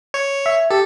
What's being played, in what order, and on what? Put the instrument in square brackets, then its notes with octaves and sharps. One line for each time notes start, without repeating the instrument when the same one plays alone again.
[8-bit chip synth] C#5
[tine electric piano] E5
[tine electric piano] G4 [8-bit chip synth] A4